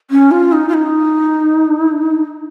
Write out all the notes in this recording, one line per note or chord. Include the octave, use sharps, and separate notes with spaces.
C#4
F4
D#4
F4
D#4